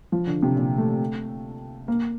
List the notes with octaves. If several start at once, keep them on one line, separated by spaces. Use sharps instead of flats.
F3
D3
C3
A#2
A3
A#3